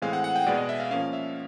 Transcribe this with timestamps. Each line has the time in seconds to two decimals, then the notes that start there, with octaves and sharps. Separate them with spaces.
0.02 A2 E3 G#3 C4 F5
0.13 F#5
0.24 F#5
0.36 G5
0.46 B2 G#3 B3 D5
0.57 D#5
0.69 E5
0.80 F5
0.91 F3 A#3 C#4 F5
1.13 E5